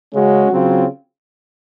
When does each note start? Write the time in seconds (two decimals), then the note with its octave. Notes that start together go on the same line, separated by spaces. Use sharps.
0.14 C#3 G#3 C#4 F#4
0.50 C#3 F#3 C4 F4